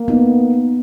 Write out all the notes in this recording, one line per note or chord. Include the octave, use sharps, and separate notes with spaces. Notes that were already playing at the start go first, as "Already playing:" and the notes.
Already playing: A#3
B3 D#4